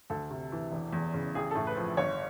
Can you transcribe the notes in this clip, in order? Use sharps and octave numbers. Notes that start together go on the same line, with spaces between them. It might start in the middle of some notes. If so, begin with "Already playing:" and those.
D2 A4
C3
E3
E1
E2
C#3
A1 G#4
A2 A4
B4
F3
G1 C#5